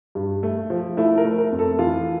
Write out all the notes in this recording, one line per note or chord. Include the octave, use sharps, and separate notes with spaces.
G2
A3
F3
A3 E4
A#4
A3
A#4
F2
A4
E3 F4